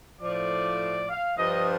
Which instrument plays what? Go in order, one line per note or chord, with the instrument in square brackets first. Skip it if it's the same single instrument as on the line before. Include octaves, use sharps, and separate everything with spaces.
[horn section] A2 F3 D5
F5
G2 F3 D#5